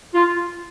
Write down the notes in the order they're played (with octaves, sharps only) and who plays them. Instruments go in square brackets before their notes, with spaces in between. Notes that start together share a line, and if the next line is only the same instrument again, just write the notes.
[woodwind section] F4